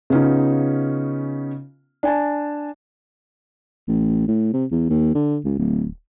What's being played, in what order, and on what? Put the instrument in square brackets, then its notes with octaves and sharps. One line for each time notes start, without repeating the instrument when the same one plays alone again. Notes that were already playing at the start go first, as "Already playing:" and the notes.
[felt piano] C#3 B3 C#4 D#4 F4
D4 G#5 A5
[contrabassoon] A1
A2
C3
E2
D#2
D3
C#2
D1